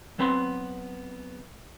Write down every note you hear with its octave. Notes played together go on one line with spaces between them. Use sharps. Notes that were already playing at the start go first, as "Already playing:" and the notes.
F#3 B3 C4 B4 A5 C6